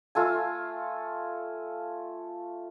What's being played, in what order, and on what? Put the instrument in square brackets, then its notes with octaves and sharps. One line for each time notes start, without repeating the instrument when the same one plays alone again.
[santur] A3 F4 A4 G#5